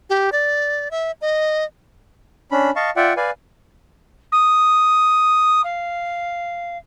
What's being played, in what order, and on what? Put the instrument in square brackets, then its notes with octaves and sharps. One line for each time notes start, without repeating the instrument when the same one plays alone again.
[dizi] G4
D5
E5
D#5
[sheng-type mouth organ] C#4 D4 B5
D#5 F5 A5 C#6
F4 D5 E5 F#5 G5
B4 D5 F5 G#5
[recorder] D#6
F5